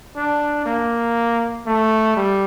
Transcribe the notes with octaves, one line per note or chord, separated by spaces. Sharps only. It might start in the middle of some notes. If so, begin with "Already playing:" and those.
D4
A#3
A3
G3